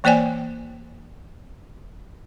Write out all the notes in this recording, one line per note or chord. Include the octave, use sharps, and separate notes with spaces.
E3 A#3 C5 D5 G5 G#5